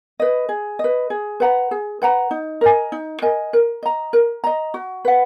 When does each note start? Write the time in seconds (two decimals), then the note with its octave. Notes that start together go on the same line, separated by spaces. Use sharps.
0.20 B4 D#5
0.49 G#4
0.79 B4 D#5
1.10 G#4
1.40 B4 F#5 A#5
1.71 G#4
2.02 B4 F#5 A#5
2.31 D#4
2.61 A#4 D#5 G#5
2.92 D#4
3.22 A#4 D#5 G#5
3.53 A#4
3.83 D#5 A#5
4.13 A#4
4.44 D#5 A#5
4.74 F#4
5.05 B4 F#5